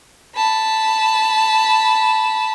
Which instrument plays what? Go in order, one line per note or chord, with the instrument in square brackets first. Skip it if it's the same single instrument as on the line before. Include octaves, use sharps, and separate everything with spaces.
[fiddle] A5 B5